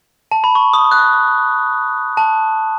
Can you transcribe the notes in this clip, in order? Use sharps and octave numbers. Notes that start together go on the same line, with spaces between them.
A5
B5
C#6
D#6
F#6
A5